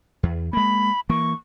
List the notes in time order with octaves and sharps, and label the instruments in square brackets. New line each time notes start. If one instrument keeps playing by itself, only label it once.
[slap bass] E2
[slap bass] G#3 A#3 [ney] B5
[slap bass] E3 A#3 [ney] C#6